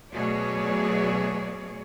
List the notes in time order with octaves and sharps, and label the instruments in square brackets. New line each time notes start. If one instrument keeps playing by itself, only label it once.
[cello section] B2 F#3 A3 G#4 C#5 D5